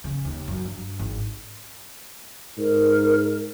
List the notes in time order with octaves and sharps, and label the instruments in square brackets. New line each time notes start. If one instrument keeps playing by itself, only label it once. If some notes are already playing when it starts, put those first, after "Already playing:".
[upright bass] C#3
D#2
F#2
G2
G#1
[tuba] G#2 [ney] A#4